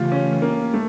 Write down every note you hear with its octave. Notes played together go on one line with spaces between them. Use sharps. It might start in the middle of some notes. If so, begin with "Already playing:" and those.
Already playing: C#3 E3 A3 F4 G4
C#4
A#3
A3